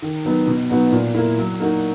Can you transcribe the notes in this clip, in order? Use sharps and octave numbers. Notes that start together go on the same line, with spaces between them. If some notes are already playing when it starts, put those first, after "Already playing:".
D#3
F#3 B3 D#4
B2
F#3 B3 D#4 F#4
A#2
A#3 E4
F#3
A#3 D#4 F#4